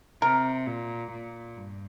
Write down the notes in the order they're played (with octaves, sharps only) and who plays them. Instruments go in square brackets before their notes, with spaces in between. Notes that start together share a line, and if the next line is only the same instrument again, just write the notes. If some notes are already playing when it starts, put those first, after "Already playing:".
[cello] C3 [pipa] A#4
[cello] A#2
A#2
G2